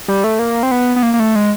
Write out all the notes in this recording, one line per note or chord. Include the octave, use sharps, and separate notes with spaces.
G3
A3
A#3
C4
B3
B3
A#3
A#3
A3
G#3